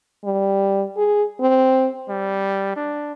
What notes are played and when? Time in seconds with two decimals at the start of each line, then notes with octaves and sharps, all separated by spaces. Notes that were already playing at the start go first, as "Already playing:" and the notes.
0.25 G3
0.97 G#4
1.41 C4
2.09 G3
2.76 D4